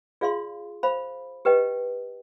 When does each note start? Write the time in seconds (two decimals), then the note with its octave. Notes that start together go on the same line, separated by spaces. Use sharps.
0.21 F4 G#4 D5 F5 C6
0.83 C5 F5 B5
1.45 G4 B4 D#5 G5